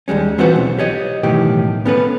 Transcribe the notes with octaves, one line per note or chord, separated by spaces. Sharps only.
D#2 G3 G#3 C#4
E3 C4 F4 F#4 B4 C5
B1
G4 C#5 D#5
B1 A2 D#3 E3 G4
B3 C#4 A4 B4